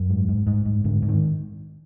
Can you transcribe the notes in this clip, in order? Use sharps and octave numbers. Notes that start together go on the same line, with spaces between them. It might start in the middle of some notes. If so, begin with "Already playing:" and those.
Already playing: F#2
G#2
G#2
G#2
G#2
G#2 D3
G#2
D#3